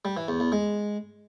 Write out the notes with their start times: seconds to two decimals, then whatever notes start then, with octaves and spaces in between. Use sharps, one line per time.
0.05 G3
0.17 E3
0.28 E2
0.40 E2
0.52 G#3